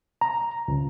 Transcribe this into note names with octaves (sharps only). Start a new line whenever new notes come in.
A#5
C#2